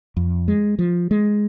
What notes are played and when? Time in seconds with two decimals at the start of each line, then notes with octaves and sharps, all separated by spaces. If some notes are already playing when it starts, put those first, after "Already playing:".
0.17 F2
0.48 G#3
0.79 F3
1.11 G#3